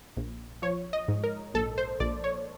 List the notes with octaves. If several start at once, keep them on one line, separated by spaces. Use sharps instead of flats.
A#1
F3 C#5
D#5
G#2
A#4
A#1 A4
C5
A#1 D5
C#5